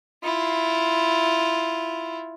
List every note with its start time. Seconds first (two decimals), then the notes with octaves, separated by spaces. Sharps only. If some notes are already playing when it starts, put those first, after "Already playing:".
0.24 E4 F4